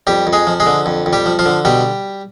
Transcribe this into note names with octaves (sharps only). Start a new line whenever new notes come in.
F2 G3 G4
F2
G#3 G#4
F3
G#3 G#4
D3
F2
F2
G3 G4
F3
F3 F4
D3
B2 G3 G4